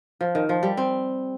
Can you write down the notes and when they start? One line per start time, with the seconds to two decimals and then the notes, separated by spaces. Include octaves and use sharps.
0.21 F3
0.35 D#3
0.49 F3
0.63 G3
0.77 C4